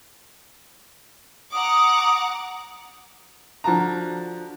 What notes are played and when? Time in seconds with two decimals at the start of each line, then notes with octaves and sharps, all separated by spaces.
1.53 F#5 A#5 D6 D#6
3.64 D3 F3 F#4 A5 A#5